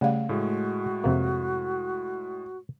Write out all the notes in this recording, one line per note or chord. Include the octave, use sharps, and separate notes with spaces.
C#3 G3 A3 F5
A2 G#3 F#4
F2 C3 A#3